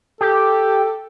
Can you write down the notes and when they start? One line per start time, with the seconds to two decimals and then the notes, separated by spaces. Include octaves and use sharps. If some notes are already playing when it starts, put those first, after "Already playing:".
0.21 G4 A4